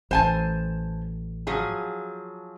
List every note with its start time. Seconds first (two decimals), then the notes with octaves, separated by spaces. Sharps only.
0.11 A1 C5 G#5 A5
1.47 F3 F#3 G#4